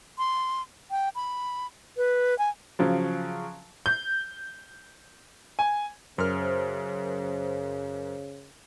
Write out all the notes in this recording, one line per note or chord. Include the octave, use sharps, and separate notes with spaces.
C6
G5
B5
B4
G#5
C#3 F3 F#3
G6
G#5
F#2 C#3 A#4 C5 F6